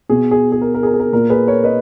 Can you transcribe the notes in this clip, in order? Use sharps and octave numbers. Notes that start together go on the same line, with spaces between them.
B2 G#4
G#4
G#4
A#4
A#4
G#4
A#4
G#4
A#4
A#2 A#4
G#4 B4
A#4 C#5
B4 D#5